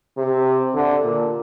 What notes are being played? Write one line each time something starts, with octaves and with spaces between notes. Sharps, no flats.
C3
D3
A#2